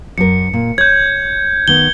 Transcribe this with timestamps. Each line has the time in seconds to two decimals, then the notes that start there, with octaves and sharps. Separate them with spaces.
0.18 F#2 A#4 C#7
0.53 A#2
0.78 C#5 G6 G#6
1.68 D#3 B3 G7